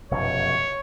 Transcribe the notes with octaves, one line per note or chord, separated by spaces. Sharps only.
F1 F#2 B2 C#5